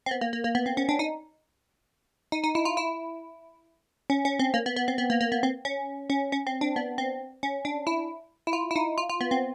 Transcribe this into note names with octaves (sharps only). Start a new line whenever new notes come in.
C4
B3
A#3
A#3
A#3
B3
C4
C#4
D4
D#4
D#4
D#4
E4
F4
E4
C#4
C#4
C4
A#3
B3
B3
C4
B3
A#3
A#3
B3
C4
C#4
C#4
C#4
C4
D4
B3
C4
C#4
D4
E4
E4
F4
E4
D#4
F4
F4
B3
C4